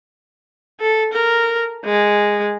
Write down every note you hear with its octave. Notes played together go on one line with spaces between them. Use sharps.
A4
A#4
G#3